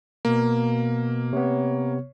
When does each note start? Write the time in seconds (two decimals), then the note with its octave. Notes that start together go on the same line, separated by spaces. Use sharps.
0.25 B2 A#3
1.33 C3 B3 C#5